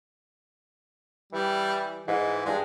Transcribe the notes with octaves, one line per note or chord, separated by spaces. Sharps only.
E3 G3
G#2 E3
G2 G#3